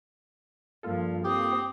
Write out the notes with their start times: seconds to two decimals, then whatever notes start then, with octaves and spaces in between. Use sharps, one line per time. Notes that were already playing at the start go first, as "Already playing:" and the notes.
0.83 G2 F3 A#3 F4 A4
1.24 C4 G4 D#6